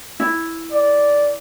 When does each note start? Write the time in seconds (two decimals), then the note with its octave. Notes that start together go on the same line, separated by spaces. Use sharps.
0.20 E4
0.72 D5